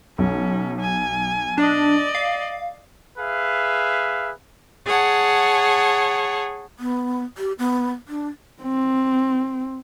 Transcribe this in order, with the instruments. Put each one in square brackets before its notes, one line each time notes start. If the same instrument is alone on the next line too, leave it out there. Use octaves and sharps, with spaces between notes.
[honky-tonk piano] B1 [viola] C#4
[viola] G#5
[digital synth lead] D4 [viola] D5 D#5
[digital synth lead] F5
[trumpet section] G#4 B4 E5 F5
[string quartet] G#4 C#5 F#5 A5
[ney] B3
G4
B3
D4
[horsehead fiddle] C4